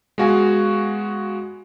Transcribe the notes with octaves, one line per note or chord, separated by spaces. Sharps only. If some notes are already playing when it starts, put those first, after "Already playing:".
G#3 B3 F#4 F5 G#5